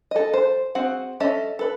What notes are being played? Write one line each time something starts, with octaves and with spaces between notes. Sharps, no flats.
A4 D#5
C5
C4 F#4 G#4 F#5
C#4 A4 D#5 E5
A4 B4